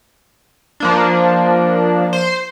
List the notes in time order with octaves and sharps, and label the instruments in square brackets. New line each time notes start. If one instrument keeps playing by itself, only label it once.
[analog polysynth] F3 A#3 D4
C5